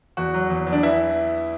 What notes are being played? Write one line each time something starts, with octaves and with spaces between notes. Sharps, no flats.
E2 F#4
F#3
E2
E2
D4
E3 E4